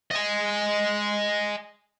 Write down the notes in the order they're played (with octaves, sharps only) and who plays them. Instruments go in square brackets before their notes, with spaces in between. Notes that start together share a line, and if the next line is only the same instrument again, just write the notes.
[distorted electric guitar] D#5 G#5